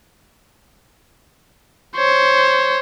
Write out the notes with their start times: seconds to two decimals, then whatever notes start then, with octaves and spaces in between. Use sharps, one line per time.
1.96 C5 C#5